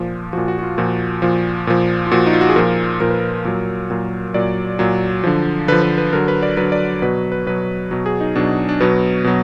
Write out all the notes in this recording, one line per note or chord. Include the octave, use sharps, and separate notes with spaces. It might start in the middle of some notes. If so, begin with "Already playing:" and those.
Already playing: A#2 F3
A#2 F3 F#4
F#4
F#4
F4
A#2 F3 F#4
A#2 F3
A#2 F3
F4
A#2 F3 F#4
D#4
F4
F#4
G#4
A#2 F3 A#4
A#2 F3 A#4
B4
A#4
A#2 F#3
A#2 F#3
A#2 F#3 D5
A#2 F#3
D3 F3
D3 F3 B4
B4
B4
D3 F#3 A#4
B4
D5
D3 F#3 B4
D5
B2 F#3 B4
B4
B2 F#3 B4
B2 F#3
G#4
D#4
B2 F#3 D4
D4
B2 F#3 B3
B2 F#3